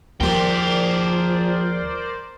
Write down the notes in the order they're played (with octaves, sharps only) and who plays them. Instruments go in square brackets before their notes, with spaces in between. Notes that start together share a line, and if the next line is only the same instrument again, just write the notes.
[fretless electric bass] D#2 G3 [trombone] F3 [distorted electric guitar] G#4 G5 [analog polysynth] A#4 C5 D5